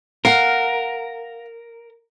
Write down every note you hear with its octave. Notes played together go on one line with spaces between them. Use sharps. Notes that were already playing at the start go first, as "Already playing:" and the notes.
A#4 F5 F#5